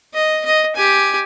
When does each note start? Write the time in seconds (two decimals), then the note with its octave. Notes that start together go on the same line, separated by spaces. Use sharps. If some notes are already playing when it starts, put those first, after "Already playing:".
0.14 D#5
0.46 D#5
0.76 G4 G#5